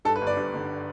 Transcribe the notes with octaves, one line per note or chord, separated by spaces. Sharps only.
G2 A4
B4
G1
D5
G2
D3